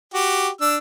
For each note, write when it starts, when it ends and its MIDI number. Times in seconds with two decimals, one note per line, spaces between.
0.14 0.49 66
0.14 0.49 67
0.61 0.77 62
0.61 0.77 88